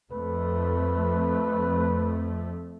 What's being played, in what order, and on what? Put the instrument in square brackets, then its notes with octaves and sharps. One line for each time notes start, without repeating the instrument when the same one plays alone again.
[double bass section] F2 A3 [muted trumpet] B4